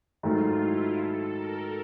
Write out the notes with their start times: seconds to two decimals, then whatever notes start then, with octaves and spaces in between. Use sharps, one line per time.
0.23 G#2 D#3 F#3 A3 F4
0.61 E4
0.99 A4
1.36 A#4